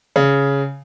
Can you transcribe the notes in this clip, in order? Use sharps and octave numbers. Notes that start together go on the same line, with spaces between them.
C#3